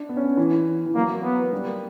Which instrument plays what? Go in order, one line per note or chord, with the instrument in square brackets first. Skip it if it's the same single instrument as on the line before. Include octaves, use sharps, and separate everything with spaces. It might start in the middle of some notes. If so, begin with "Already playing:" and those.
Already playing: [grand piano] D4
B3
C#4
B3
E3
E3
[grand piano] F#3 [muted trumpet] A#3
[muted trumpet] B3
[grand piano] G3
A#3